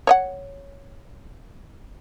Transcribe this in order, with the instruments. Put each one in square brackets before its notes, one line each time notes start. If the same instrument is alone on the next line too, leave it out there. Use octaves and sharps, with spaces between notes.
[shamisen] C#5 D#5 F#5